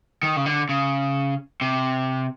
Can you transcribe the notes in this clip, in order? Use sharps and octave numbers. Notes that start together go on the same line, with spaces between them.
D#3
C#3
D3
C#3
C3